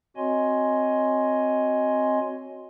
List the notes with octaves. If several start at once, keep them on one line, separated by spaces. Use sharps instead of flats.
C4 F#4 C#5 D#5 G#5 C6